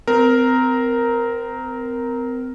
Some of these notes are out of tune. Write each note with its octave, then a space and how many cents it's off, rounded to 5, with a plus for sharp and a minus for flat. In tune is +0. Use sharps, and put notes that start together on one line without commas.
C4 -30 A#4 +0